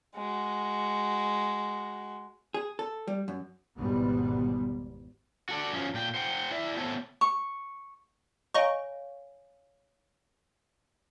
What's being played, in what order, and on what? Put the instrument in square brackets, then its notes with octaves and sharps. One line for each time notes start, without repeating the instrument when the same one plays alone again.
[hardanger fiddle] G#3 F#4
[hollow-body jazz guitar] G#4
A4
G3
F#2
[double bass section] G#1 E2 G#2 B2 G3 B3
[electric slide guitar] F#4 A4 D5
F#2 F3 C#4
A#2 G5
C5 F#5 G5
E4 D5 E5
A3 B3 C4 A4 C5 C#5
[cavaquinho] C#6
[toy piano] C#5 F5 G#5 [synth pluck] D#5 A#5 C#6